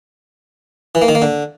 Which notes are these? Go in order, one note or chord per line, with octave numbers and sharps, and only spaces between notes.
E3
A#3
D#3
A#3
D3